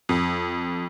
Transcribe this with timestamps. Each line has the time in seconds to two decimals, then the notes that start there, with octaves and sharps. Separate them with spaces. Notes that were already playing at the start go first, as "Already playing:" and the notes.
0.09 F2